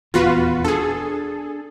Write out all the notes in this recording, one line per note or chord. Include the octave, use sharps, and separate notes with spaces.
D#1 E2 B3 F4 F#4 B4
D4 G#4 A4